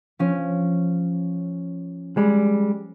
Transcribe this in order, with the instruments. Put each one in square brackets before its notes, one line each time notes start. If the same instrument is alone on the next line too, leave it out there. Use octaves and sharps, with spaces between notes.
[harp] F3 C#4
[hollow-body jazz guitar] G3 G#3